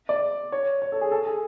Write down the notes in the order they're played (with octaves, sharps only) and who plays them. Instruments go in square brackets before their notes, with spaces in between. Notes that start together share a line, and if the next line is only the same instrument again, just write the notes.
[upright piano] D5
C#5
C#5
A4
G#4
A4
G#4